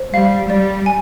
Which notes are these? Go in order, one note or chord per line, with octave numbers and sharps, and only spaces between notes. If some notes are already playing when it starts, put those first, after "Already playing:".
Already playing: C5
G3 F5
G3 D5
G#5